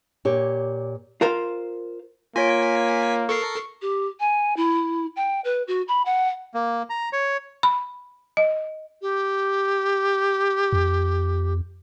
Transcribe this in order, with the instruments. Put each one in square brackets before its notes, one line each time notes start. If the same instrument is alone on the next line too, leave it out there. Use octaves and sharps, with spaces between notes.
[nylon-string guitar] A#2 G4 C#5
[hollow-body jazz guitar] F4 A#4 C5 F5
[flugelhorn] A#3 [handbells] F4 C#5 D7 [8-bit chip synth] G#5 B6
[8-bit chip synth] A4 A#4 C7 [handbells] C#6
[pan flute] G4
G#5
E4
G5
B4
F#4
B5
F#5
[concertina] A#3
A#5
C#5
[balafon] B5
D#5
[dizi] G4
[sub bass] F2